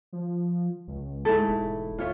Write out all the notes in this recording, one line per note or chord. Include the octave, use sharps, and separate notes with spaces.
F3
C#2
G#2 A3 E4 A4
E1
D2 F4 C#5 E5